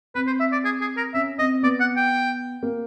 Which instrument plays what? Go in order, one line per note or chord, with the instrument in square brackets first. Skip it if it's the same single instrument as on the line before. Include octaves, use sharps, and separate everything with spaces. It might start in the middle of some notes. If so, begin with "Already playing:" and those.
[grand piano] C4 [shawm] B4
[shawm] C5
E5
D5
G#4
G#4
A#4
[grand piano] C#4 [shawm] E5
[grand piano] C4 [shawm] D#5
[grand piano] B3 [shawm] D5
[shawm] F#5
G5
[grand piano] A#3